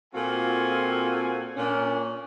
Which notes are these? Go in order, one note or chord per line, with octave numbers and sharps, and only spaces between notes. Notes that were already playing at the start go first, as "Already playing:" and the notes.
A#2 C4 F4 F#4 A4 G#5
A#2 C#4 D4